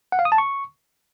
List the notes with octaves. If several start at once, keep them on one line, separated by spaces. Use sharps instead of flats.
F#5
F5
D#6
A5
C#6